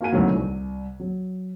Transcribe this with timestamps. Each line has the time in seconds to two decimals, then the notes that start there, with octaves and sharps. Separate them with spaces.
0.01 A#3 F#4 G#5 D#7
0.12 D2 C3 D#3 F#3
0.34 C2
1.00 F#3